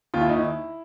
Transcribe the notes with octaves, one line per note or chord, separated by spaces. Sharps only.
D#2 F4
E4
D#4
E4